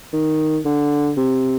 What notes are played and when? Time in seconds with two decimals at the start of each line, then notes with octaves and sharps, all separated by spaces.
0.13 D#3
0.65 D3
1.17 C3